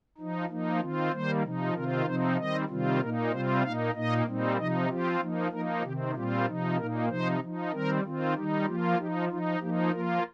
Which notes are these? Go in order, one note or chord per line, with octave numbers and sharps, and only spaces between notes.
F3 D#4
F3 A#3 D#4
D#3 C4 F4
D#3 G3 A#3 C5
C3 F3 D#4
C3 D#3 C4 F4 A#4
C3 F3 C4 D#4 C5
D#3 G3 C4 D#5
C3 D#3 G3 C4 F4
A#2 A#3 D#4 A#4
C3 G3 C4 F4 C5
A#2 A#3 D#4 F5
A#2 A#3 D#4 D#5
A#2 G3 C4 D#4
C3 F3 D#4 D#5
F3 C4 F4 G4
F3 A#3 D#4
F3 A#3 D#4 A#4
C3 D#3 C4 G4
A#2 G3 C4 F4 G4
C3 F3 D#4
A#2 A#3 D#4 A#4
C3 F3 D#4 C5
F3 D#4
D#3 G3 C4 A#4
D#3 C4 F4
D#3 G3 D#4 G4
F3 A#3 F4 G4
F3 D#4 G4
F3 D#4 F4
F3 A#3 D#4 G4
F3 A#3 F4 A#4